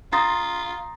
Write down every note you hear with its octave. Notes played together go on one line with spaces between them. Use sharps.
F4 A#5 C6 D#6 A6 A#6